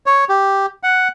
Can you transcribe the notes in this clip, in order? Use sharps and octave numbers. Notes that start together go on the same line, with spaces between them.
C#5
G4
F#5